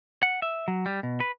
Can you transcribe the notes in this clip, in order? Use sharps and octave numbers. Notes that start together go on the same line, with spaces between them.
F#5
E5
F#3
G3
B2
B4